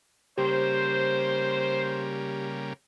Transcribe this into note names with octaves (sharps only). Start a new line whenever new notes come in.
C#3 G3 A#3 G4 C5